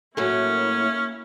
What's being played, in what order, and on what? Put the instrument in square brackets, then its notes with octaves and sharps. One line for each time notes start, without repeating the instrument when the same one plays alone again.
[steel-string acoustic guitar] A2 F#3 [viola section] A#3 E4 [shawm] C#4